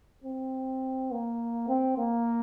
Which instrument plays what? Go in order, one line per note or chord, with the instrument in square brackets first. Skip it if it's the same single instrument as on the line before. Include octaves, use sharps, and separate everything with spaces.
[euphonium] C4
A#3
C4
A#3